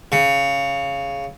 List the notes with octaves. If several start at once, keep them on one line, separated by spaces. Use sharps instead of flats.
C#3